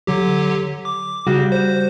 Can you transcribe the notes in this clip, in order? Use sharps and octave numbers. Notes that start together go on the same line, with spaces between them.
D3 F#3 G4
D6
C#3 G3 F#4
C5